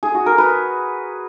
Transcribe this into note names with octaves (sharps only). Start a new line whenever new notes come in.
G#4
F#4
A#4
B4